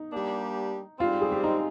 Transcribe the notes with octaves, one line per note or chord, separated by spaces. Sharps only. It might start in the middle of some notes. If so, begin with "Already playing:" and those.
Already playing: D#4
G3 A#3 D4 G4
G#2 G3 C4 F4
G#4
G4
D#4